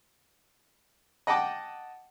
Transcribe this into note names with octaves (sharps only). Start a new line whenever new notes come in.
D#5 F#5 G5 A5 D6